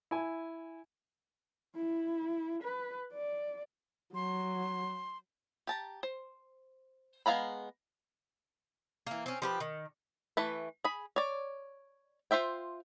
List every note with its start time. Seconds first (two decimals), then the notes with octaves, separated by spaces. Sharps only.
0.11 E4 G#5
1.76 E4
2.63 B4
3.13 D5
4.15 F#3 C6
5.67 G4 A5 A#5
6.03 C5
7.26 G#3 B3 F5 A#5 B5
9.07 E3 A#3
9.26 C4 C#4
9.42 F3 G4 B4
9.60 D#3
10.37 E3 A3 B4
10.84 G#4 B5
11.16 C#5 D5
12.31 F4 C5 E5 G5